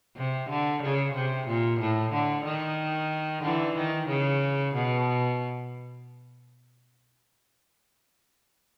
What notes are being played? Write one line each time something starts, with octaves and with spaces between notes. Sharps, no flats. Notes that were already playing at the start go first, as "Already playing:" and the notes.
C3
D3
C#3
C3
A#2
A2
D3
D#3
D3 E3
D#3
C#3
B2